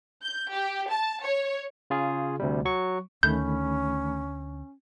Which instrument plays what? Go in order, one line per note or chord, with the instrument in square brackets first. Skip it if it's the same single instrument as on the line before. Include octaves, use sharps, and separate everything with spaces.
[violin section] G6
G4
A5
C#5
[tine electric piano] C#3 F4 G#4
D2 C3 G3
F#3 C#6
[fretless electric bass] D2 [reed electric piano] D#3 A3 B5 [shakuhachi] C#4 [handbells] G6